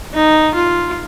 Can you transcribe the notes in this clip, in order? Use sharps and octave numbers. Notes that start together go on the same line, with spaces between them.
D#4
F4